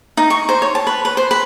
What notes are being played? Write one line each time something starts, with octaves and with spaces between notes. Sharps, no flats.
D#4
C#6
C5
C#5
A5
B4
B4
C5
B4